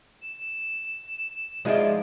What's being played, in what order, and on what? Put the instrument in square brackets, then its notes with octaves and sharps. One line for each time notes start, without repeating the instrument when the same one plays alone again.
[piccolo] E7
[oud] F3 D#4 F4 [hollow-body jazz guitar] G#3 G#4 D5